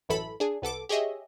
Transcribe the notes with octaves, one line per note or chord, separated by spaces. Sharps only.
A1 F#2 E3 E4 A4 B5
D4 G#4
C2 B3 A4 D6
G4 G#4 C#5 D#5 E5